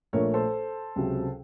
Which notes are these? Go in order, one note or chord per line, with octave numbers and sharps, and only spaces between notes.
A#1 A#2 A3 A#4 C#5
A4 C5
C#2 C3 F#3